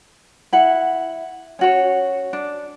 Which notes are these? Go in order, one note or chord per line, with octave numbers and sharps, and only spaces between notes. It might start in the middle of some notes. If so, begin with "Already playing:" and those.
E4 F#5
C#4 F#4 C#5
D4